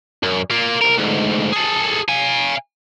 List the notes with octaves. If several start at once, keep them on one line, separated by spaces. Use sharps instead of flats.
F#2
A#3 F4
C2 A#4
D2 G#2
G#4 A4
F5 G#5